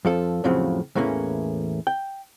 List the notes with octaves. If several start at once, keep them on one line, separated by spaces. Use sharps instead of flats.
F2 F3 A4
F2 A2 C#3 F3 F#3 C4
E2 A2 E3 A#3 C#4
G5